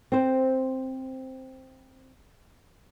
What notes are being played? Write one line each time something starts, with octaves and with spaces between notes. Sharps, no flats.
C4 C5